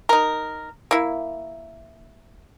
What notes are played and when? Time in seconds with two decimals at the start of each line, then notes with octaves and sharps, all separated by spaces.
0.09 D#4 A#4
0.91 A#3 E4